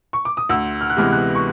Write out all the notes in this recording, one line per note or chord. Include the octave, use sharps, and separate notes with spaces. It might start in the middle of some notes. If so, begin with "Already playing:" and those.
C#6
D6
D#6
D2 E6
F6
F#6
C3 E3 G#3 B3 F6
F#6
C#6